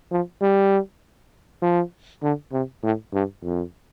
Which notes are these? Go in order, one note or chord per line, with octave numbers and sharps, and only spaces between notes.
F3
G3
F3
D3
C3
A2
G2
F2